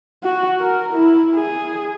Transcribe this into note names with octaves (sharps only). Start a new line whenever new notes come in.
F#4
A#4
E4
G#4